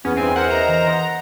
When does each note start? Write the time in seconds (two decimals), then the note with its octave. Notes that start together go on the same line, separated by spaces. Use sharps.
0.05 E2 B3 C#4
0.17 G2 C4 G#5
0.36 A#4 C5 E5 F#5
0.51 D#5 F5 A#5
0.68 E3
0.86 F#5 D#6